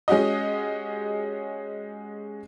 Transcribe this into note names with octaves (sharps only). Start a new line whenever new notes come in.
G#3 C#4 F#4 G4 D#5